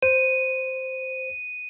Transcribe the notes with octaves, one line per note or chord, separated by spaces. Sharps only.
C5 D#7